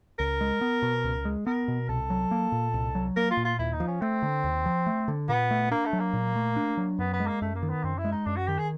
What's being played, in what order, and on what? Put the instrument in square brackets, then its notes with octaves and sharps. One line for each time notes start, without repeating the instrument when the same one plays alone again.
[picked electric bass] C#2 [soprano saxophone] A#4
[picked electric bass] G#3
B3
B2
C#2
G#3
[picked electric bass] B3 [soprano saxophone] A#4
[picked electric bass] B2
[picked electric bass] C2 [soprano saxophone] A4
[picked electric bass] F#3
A#3
A#2
C2
F#3
[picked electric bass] A#3 [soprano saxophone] A#4
[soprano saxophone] F4
[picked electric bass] A#2
[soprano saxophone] F4
[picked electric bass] D#2 [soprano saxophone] E4
[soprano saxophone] D#4
[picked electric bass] F3
[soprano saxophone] C#4
[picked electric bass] A3 [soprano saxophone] C4
[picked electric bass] D3
D#2
F3
A3
D3
[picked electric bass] A#2 [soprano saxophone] B3
[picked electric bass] A3
[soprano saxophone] A#3 [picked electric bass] D4
[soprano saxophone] A3
[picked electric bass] F#3
[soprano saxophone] A#3
[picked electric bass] A#2
A3
D4
F#3
[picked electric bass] F#2 [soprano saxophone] B3
[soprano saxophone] B3
[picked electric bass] G#3
[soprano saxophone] A#3
[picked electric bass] F#2 [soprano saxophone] A3
[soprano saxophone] A#3
[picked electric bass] D#3
[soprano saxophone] B3
[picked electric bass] F#2 [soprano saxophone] C4
[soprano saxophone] E4
[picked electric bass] G#3
[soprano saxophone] D#4
[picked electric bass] F#2 [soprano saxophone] D4
[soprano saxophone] F#4
[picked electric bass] D#3 [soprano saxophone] G4
[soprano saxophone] G#4